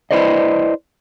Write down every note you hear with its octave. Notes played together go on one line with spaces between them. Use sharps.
E4 B4 C5 D5 D#5